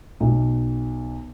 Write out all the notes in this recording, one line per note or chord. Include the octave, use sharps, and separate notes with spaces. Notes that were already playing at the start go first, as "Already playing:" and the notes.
B1